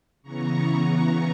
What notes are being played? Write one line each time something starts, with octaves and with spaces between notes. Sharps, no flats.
C#3 E3 B3 A#5 C#6